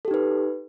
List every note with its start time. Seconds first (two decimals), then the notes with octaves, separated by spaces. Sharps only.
0.05 A4
0.08 G4
0.11 D#4
0.14 B4